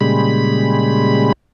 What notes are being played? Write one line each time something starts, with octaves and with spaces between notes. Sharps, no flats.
A#2 C#3 G3 G#3 B5